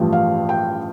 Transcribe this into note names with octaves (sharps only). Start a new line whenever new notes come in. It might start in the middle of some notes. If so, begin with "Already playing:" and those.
Already playing: A1 G2 F3 G5
F5
G5